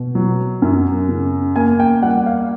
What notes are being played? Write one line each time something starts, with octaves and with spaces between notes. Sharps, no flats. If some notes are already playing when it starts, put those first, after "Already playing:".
Already playing: B2
F#3
F#2
C#3
A#3 G#5
G5
G3 F#5
F5